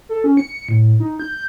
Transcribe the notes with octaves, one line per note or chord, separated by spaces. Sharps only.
A4
C#4
C#7
A2
D#4
G6